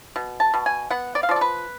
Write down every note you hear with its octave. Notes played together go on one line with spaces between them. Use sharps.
B2
A5
B2
G#5
B3 F#5
D5
F5
F3 D5
A4
B4